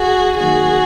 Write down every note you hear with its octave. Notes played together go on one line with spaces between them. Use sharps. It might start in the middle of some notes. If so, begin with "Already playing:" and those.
Already playing: F#4 G#4
D#3 F#3 A#3 F#4 G#4